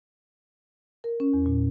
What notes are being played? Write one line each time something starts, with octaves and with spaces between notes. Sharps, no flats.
A#4
C#4
E2
A#2